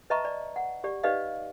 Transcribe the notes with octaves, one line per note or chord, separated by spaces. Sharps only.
B4 D#5 E5 A5 A#5 C#6
D5
F#5
G4 D5
D#4 G4 B4 D5 D#5 F5